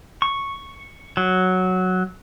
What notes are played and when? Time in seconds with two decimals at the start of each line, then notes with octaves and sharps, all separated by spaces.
0.22 C#6
1.17 F#3